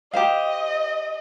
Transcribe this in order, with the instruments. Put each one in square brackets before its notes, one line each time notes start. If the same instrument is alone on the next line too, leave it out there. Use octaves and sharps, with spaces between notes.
[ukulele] G4 C5 F5 [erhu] D#5